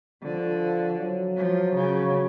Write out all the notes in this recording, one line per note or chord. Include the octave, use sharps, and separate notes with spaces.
D3 F3
F#3
F3
C#3